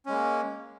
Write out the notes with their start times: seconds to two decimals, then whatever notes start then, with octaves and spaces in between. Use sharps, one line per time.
0.06 C#4
0.09 G#3
0.12 A#3